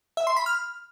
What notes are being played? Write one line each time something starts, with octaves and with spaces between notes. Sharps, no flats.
E5
C6
B5
F6